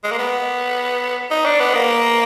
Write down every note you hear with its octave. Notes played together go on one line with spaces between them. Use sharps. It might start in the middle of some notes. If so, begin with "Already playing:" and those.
G#3
A#3
B3
D#4
D4
B3
A#3